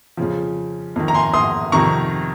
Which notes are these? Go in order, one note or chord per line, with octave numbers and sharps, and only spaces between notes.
F2 C#3 F3
F2 D#3
A#5
G#5 C6
C6 D#6
F2 C3 D#3 A#5 C#6